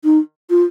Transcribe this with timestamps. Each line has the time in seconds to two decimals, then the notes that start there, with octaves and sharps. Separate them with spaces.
0.04 D#4
0.50 F4